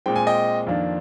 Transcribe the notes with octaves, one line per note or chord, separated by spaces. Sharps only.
A#2 G#3 C4 G5
G#5
D#5 G5
F2 D#3 A#3 D4 F4